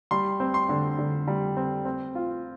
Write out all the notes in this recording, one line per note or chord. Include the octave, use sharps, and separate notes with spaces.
G3 C6
C4
C6
D3
D3
G3
C4
C4
F4